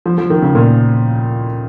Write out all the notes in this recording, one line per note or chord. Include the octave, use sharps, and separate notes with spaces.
F3
F3
D#3
C#3
A#2